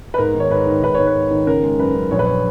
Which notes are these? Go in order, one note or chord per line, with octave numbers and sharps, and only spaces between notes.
B4
G#2 A#4
D#3
C#5
G#2 B4
D#3
G#2 B4
C#5
G#2
B4
G#2
D#3
C#3 A#4
G#3
F#2 B4
F#2
A#1 C#5
B4
C#5